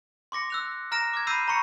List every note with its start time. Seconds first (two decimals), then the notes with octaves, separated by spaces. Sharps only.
0.32 C6 D6 A#6 C#7
0.50 E6 F#6 F7
0.92 A#5 F6 A#6 D7 E7
1.13 D6 F6 G#6
1.27 B5 E6 G6 A#6 C7 D#7
1.48 A#5 B5 C#6 C#7